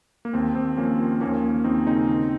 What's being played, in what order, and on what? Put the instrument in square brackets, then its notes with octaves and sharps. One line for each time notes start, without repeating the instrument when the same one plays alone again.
[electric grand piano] A#3
D#2 C4
D#2 C4
F3 A#3 C#4
F3
D#2 A#3 C#4
D#2
D#2 C4 D#4
C#3 C4 D#4
D#3